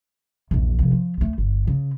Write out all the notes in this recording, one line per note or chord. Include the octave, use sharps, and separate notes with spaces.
A#1 E2
F2 C3
F3
D2 A3
G1
C#3